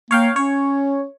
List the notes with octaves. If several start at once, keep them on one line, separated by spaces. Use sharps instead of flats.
A#3 C#5 F5 G5
C#4 C#5